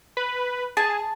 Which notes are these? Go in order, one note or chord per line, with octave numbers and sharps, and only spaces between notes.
B4
G#4 A5